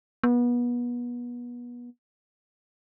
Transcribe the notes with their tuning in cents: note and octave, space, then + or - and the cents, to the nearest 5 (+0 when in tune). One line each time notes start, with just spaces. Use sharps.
B3 -30